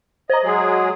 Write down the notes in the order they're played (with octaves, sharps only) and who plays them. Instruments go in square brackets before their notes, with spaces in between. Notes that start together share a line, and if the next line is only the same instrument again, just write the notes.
[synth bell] C5 A#5 [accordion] D#5
[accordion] F#3 G#3 G#4